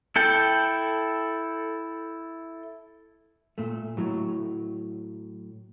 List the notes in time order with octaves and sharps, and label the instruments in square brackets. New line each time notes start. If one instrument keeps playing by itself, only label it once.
[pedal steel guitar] E4 A4 G5
[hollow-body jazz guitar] A#2 A3
A2 F#3